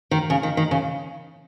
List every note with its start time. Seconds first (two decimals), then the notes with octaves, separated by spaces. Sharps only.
0.11 D#3
0.30 C#3
0.43 D#3
0.57 D#3
0.71 C#3